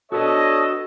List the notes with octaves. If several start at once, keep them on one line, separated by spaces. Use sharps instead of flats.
D4 F#4 A4 B4 C#5 D#5